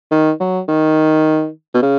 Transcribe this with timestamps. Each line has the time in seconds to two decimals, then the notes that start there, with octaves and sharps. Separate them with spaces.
0.11 D#3
0.40 F#3
0.68 D#3
1.74 B2
1.82 C#3